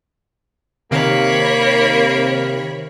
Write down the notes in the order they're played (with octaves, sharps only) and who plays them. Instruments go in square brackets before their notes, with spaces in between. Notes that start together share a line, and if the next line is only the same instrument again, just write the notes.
[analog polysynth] C3 D#3 F5 [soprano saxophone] A#3 [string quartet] C#5 B5